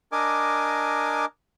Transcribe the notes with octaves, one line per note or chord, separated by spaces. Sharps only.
D4 A#4 D#5 G#5 D6